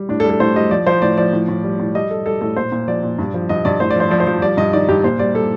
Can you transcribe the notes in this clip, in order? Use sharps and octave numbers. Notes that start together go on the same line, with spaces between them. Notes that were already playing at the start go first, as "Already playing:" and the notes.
Already playing: G3
A2 D4
A4
G3
A4
A2 C5
G3 D#5
F3 D5
F3 C5
A2 D5
F3 D5
A2
A2
G3
A2
G3 D#5
G3 A4
G3 A4
A2 A4
A#2 C5
A#2
F3 D5
A#2
G2
F3
G2 D#5
G2 D5
A2 C5
D5
F3 C5
F3 D5
C5
F3
G3 D5
G2 D#5
D#3 D5
G2 G4
A#2 C5
G3 D5
G3 A4